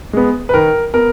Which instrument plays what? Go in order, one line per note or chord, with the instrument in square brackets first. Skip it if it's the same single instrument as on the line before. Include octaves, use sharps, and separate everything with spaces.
[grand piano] G#3 B3
B4
D#3 A#4
B3 A#4